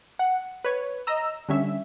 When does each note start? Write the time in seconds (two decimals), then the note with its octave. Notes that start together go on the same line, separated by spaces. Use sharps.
0.19 F#5
0.65 B4 C#5
1.07 D#5 A#5 E6
1.49 D3 G3 C#4 E5